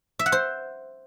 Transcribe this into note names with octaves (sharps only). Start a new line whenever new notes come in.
E5
F#5
C5